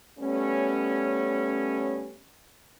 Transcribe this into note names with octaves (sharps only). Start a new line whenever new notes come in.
G3 A3 B3 C#4